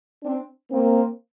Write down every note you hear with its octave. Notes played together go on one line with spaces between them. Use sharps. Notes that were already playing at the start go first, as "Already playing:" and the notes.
C4 D4
A#3 C4